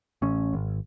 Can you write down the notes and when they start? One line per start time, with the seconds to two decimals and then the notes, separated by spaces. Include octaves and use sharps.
0.22 A1 C#4
0.53 G#1